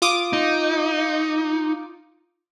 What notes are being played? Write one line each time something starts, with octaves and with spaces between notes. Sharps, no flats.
F4 D6 D#6
D#4